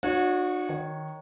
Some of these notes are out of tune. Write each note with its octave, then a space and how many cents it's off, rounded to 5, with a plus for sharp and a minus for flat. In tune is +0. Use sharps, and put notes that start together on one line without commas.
D4 +45 F#4 -30 C#5 +0
D#3 -5 C#5 +0